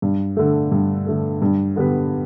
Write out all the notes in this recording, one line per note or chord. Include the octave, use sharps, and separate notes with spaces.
G2
D3 A3
G2
D3 A3
G2
D3 B3 G4 B4